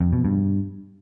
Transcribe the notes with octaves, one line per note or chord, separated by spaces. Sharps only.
F2
B2
G2